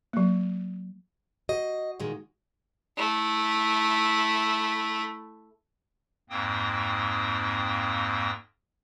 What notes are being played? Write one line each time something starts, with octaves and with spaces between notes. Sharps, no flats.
F#3 A#3
F#4 D#5
A#2 D#3 G#3
A3 E4
F2 G#2 A#3 C4 G5 D#6